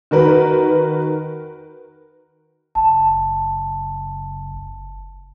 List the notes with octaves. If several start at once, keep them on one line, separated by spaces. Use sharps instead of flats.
D#3 F#4 A#4 B4
F#1 A5